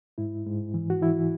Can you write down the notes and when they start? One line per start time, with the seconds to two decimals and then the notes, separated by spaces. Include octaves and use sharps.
0.18 G#2 E4
0.46 G#2
0.74 E3
0.90 F#4
1.02 E3 E4